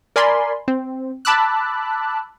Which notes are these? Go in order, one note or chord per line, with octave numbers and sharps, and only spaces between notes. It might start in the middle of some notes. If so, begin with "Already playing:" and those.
A#4 D5 G#5 B5 C6
C4
A5 B5 D6 E6 F#6